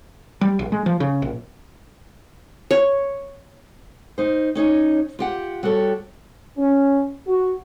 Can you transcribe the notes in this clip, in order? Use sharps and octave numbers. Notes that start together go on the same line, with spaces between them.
G3
A#1
G#3
F3
C#3
A#1
C#5
D#4 C5
C#4 D#4 C#5
F4 G4 F#5
G3 F#4 G4 A4 C#5
C#4
F#4